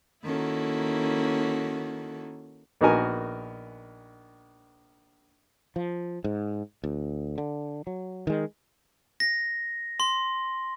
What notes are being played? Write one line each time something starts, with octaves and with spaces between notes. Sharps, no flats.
D#3 A#3 C#4 E4 F#4 A4
A#1 B3 D#4 F#4 A#4 G#5
F3
G#2
D2
D3
F#3
D#3 G#3
A#6
C6